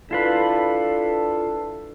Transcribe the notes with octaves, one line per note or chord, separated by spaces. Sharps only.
D4 E4 F4 A4 B4